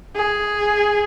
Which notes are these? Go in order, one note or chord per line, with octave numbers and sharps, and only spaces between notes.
G#4